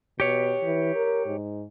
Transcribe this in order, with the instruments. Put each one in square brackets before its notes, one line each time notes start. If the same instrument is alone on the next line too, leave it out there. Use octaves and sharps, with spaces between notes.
[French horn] B2 [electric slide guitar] G4 C#5
[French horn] E3
A#4
G#2